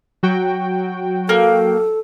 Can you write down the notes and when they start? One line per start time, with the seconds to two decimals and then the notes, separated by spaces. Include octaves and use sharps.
0.23 F#3 F#4 G5
1.29 A#3 A4